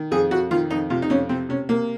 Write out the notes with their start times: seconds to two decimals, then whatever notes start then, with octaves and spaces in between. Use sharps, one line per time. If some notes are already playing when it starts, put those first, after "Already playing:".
Already playing: D#3
0.11 F2 G#4
0.31 F2 F#4
0.51 D#3 F4
0.70 F2 D#4
0.90 C3 F4
1.02 D#4
1.10 F2 C#4
1.29 C3 C4
1.49 C3 C#4
1.69 C3 A#3